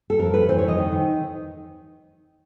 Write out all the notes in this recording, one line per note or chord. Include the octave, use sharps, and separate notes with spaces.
A4
F2 A#4
F2 B4
E3 C5
C#5
F2
D#5
D#3
D#3